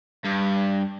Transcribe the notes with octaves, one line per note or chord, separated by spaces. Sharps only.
G2